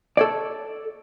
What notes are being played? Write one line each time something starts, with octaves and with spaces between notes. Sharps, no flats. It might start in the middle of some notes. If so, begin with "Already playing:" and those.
A4 C#5 D5